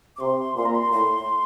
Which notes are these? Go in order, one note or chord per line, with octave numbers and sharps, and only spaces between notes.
D6
C3 C6
A#2 C6
A#5
C6
A2 C6